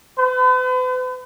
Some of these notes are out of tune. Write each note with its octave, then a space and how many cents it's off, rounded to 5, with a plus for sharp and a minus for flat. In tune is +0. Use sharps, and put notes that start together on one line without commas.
B4 +45